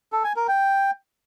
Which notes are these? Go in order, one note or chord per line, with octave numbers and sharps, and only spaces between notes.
A4
G#5
A#4
G5